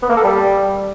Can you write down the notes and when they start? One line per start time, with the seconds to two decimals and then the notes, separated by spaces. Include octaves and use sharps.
0.02 B3
0.10 A#3
0.17 A4
0.24 G3